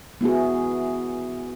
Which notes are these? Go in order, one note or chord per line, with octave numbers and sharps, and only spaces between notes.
B3 E4 F#4 G#4